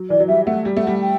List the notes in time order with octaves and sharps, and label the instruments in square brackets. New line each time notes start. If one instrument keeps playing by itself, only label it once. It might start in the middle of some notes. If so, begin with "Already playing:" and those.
Already playing: [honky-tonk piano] F#3
[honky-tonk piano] E3 [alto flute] D5
[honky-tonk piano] F#3
[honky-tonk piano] G3 [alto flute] E5
[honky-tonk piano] A3 [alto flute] F#5
[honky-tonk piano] G3
A3
[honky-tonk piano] G3 [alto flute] F#5
[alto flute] G5